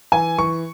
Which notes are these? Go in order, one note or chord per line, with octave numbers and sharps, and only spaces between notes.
E3 G#5
E3 C#6